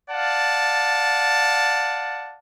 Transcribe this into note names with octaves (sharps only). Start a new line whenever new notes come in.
D5 F5 F#5 A5